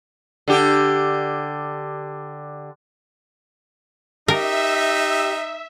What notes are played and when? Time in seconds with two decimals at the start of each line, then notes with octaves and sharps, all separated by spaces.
0.48 D3 G4
4.28 D#4 G4 A#4 E5